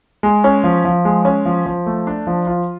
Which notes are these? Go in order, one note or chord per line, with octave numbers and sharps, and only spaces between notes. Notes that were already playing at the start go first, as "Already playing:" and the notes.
G#3
C#4
F3
F3
G#3
C#4
F3
F3
A3
D4
F3
F4